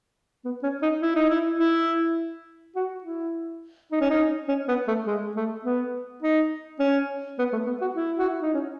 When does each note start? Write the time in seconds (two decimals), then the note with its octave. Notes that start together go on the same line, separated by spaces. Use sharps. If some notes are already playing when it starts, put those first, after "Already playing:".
0.45 B3
0.63 C#4
0.82 D#4
1.02 E4
1.16 D#4
1.30 E4
1.60 E4
2.76 F#4
3.04 E4
3.92 D#4
4.01 C#4
4.10 D#4
4.49 C#4
4.68 B3
4.88 A3
5.07 G#3
5.36 A3
5.65 B3
6.22 D#4
6.80 C#4
7.39 B3
7.53 A3
7.67 B3
7.81 F#4
7.96 E4
8.18 F#4
8.29 E4
8.42 D#4
8.54 C#4